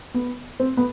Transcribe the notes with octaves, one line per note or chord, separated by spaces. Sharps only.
B3
C4
B3